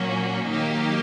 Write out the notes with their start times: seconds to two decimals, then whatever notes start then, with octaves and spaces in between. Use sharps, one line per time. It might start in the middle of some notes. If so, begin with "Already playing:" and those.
Already playing: A#2 F#3 A#3 C#4 F#4
0.48 D#3 F#3 A#3 D#4 G4